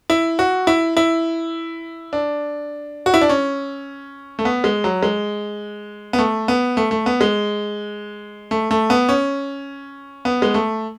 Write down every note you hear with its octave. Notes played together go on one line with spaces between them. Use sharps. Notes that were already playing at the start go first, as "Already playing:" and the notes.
E4
F#4
E4
E4
D4
F#4
E4
D4
C#4
A3
B3
G#3
F#3
G#3
B3
A3
B3
A3
A3
B3
G#3
A3
A3
B3
C#4
B3
G#3
A3